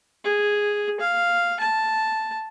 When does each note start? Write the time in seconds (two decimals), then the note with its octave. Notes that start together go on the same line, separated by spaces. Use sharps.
0.24 G#4
1.00 F5
1.60 A5